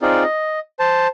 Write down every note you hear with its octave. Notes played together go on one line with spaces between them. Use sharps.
C4 D#4 F4 G#4 D5
D#5
C5 A5